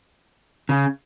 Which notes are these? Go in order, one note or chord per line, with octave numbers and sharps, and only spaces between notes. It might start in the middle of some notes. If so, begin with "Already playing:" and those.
C#3